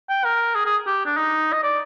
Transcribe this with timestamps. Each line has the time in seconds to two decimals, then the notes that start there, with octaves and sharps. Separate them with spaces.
0.09 G5
0.25 A#4
0.55 G#4
0.66 G#4
0.87 G4
1.06 D4
1.17 D#4
1.53 D#5
1.63 D5